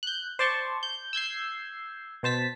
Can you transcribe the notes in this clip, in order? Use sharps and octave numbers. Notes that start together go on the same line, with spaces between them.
F#6 G6
C5 D5 A5 C6 C#6
G6
E6 G6 G#6 C7
B2 C5 A5 B6